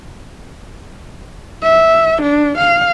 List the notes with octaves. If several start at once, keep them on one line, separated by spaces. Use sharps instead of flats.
E5
D4
F5